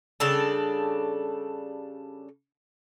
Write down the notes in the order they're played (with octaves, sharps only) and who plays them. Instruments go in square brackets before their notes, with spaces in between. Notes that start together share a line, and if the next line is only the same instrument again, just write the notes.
[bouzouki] C#3 G3 D4 A4